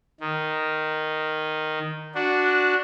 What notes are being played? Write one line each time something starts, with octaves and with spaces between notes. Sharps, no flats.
D#3
D4 F#4